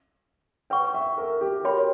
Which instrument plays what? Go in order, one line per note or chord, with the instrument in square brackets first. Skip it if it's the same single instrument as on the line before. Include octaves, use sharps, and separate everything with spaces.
[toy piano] B4 F#5 C#6 [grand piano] G5
[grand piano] E5
A#4
G4
[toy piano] F#4 C#5 G5 B5 [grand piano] A#4